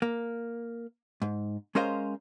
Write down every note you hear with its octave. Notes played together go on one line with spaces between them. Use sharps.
A#3
G#2
G#3 C#4 A#4 C5 D#5 F5